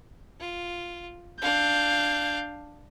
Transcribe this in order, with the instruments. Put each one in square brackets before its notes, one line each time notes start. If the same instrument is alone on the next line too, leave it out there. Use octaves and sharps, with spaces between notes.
[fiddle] F4
[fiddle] D4 F5 [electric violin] G6